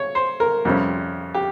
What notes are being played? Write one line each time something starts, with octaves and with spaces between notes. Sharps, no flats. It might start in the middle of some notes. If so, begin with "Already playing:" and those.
Already playing: C#5
C5
A#4
F2 C3 G3 C#4
G4